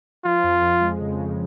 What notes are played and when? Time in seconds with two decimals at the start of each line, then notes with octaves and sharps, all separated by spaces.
0.25 F3 F4
0.44 F2
0.62 F2
0.81 G#3
1.00 C#3
1.17 F2